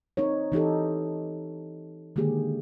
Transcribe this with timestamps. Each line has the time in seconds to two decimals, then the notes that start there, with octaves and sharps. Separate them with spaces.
0.17 C4 D#4 A#4 C#5
0.52 E3 D#4 G4 A4
2.16 D3 D#3 G#3 A#3 G4 G#4